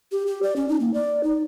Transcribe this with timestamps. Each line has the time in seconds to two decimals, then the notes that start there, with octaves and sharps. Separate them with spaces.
0.12 G4
0.27 G4
0.43 D5
0.56 C#4
0.69 D#4
0.80 A#3
0.94 D5
1.24 D#4